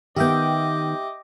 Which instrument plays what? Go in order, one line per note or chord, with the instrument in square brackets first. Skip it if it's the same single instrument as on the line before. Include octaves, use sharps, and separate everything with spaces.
[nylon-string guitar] D#3 B3 [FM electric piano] G4 E5 G5 [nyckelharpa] D#5 D6